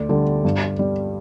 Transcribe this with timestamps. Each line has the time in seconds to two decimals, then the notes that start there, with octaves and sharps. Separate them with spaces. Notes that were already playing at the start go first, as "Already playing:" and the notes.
Already playing: D2 D5
0.09 D3 G3
0.45 G2
0.79 G3